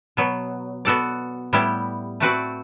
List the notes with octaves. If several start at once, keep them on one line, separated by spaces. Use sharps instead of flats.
B2 F#3 B3
B3 F#4 A4 D5
A2 G3 B3 E4 G4
A3 C4 F#4 B4 D5